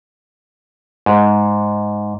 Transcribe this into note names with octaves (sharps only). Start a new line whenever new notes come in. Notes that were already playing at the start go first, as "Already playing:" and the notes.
G#2